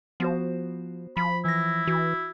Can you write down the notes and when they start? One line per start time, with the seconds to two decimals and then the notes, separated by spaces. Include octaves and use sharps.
0.20 F3 B3 F#4 C5
1.17 F3 B5
1.45 E3 E4 A#6
1.87 E3 F#4